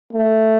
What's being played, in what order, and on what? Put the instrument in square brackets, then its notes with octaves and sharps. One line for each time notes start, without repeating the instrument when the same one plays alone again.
[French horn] A3